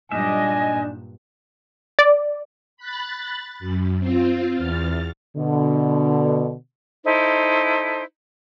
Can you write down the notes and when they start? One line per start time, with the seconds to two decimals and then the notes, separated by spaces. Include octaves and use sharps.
0.12 G2 A#2 F#3 D4 D#4 D#5 E5 G#5
1.99 D5
2.77 B5 F#6 A6
3.60 F#2
3.99 C4 F4
4.52 E2 F6 A6
5.37 B2 D3
7.05 D#4 E4 A4 C5